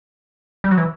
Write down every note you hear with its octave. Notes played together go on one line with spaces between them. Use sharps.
G3
F#3
E3